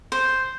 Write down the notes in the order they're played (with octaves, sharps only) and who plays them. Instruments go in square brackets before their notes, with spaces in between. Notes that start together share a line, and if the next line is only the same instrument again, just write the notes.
[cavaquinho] C5